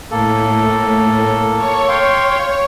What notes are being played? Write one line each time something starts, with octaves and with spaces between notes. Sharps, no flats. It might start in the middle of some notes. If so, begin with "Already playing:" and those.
A2 A#3 A4
C#5 C#6
F5 G5 C6